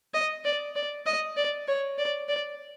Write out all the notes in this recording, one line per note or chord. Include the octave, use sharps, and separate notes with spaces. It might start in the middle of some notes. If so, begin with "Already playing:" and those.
D#5
D5
D5
D#5
D5
C#5
D5
D5